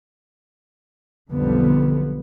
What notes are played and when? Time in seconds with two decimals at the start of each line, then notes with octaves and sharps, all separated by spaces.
1.31 B1 F2 D3 G3 B3